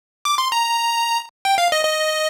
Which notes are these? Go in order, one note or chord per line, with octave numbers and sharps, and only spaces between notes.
D6
C6
A#5
G5
F5
D#5
D#5